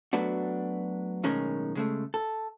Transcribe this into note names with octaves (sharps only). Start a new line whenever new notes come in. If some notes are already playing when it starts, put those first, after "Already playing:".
F#3 A3 B3 D4 F#4
B1 A2 D#3 G#3 C#4 A#4
C#3 G#3 A3
A4